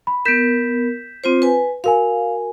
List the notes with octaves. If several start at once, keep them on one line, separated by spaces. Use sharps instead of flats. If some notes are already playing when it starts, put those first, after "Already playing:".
B5
B3 A#4 G6 B6 E7
C4 F4 C5
B4 G#5
F#4 A#4 F5 G#5